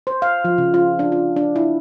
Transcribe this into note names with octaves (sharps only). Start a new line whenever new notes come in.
C5
F5
F3
C#3
F4
D4
F4
D4
E4